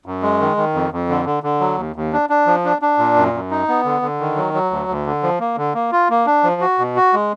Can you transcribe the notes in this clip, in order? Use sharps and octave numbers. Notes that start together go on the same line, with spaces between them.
F#2
G#3
D#3
D#3
F2
F2
D3
D3
D3
F#3
D#2
D#2
D4
D4
F3
D4
D4
A#2
F#2
F#2
D#4
B3
D3
D3
D#3
F#3
F#3
D2
D2
D3
F3
A#3
D3
A#3
F4
A#3
D4
F3
F#4
B2
F#4
G#3